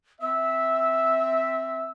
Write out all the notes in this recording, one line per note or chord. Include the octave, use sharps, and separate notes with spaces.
C4 E5 E6